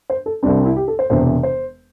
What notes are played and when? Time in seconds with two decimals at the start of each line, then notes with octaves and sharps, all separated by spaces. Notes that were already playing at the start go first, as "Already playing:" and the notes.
0.10 C5
0.26 A4
0.43 C2 C3 G3 C4 D4
0.54 D4
0.65 E4
0.76 G4
0.88 A4
0.99 C5
1.10 E1 E2 C3 C5
1.43 C5